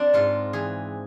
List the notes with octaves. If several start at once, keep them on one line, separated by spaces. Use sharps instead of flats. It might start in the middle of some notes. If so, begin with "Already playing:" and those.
Already playing: C4 D4
G#2 F4
E3 G#4